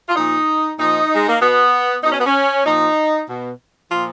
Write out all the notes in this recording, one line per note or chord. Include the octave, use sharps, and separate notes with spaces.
F4
A#2 F3 D#4
A#2 F3 D#4
G#3
A#3
B2 B3
B2 D#4
C#4
B3
C#4
A#2 F3 D#4
B2
A#2 F3 F4